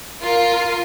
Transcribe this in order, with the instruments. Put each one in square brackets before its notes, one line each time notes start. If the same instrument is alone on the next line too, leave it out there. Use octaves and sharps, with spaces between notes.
[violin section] F4 A#4